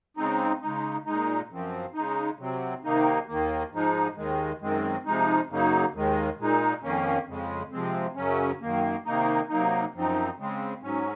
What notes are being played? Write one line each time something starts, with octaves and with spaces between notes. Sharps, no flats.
C#3 G#3 C4 D#4
C#3 G#3 D#4
A#2 G#3 D#4
F#2 F3 C4
C#3 G#3 D#4
C3 F#3 C4
C3 D#3 A#3 D#4
D#2 D#3 A#3
G#2 F3 G#3 D#4
D#2 D#3 G#3
F#2 D#3 G#3 C4
C3 F3 G#3 D#4
F#2 C#3 F#3 A#3 D#4
D#2 D#3 G#3
A#2 G#3 D#4
F2 D#3 A#3 C#4
F2 C#3 G#3
C3 F3 G#3 C4
F#2 C#3 F#3 C#4
F#2 D#3 A#3
C3 D#3 A#3 D#4
C3 F#3 A#3 D#4
F#2 F3 C4 D#4
C#3 G#3 C4
G#2 F#3 C#4